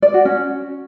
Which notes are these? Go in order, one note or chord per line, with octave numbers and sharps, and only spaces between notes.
D5
F#4
C#4